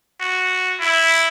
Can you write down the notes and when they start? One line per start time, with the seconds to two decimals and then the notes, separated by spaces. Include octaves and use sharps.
0.21 F#4
0.80 E4